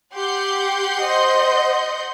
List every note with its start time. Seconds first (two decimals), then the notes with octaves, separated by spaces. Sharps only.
0.15 G4 F#5 C6 G6
1.01 C5 D#5